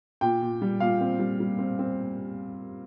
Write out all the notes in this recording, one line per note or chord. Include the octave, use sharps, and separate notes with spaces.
A#2 G5
A#2
G3
A#2 F5
C4
G3
G3
C4
C4